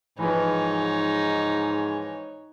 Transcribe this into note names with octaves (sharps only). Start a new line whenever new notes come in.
G#2 E3 F3 D#4 B4 C#5